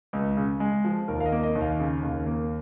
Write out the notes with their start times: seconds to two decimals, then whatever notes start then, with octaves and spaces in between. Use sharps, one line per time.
0.13 C#2
0.37 C#3
0.60 G#3
0.85 F3
1.08 D#2 A#4
1.20 F5
1.26 D#5
1.32 A#3
1.43 D#5
1.55 D#2
1.61 F5
1.80 C#3
2.03 D#2
2.26 A#3